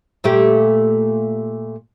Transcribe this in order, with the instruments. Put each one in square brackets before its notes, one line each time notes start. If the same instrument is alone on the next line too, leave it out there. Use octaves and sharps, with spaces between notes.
[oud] A#2 A3 G4